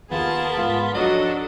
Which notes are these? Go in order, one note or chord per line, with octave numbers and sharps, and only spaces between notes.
D#2 B3 F4 G#4 A#4 A5
G#2 F4
F3 F#3 D4 D#4 F#4 A4 D#5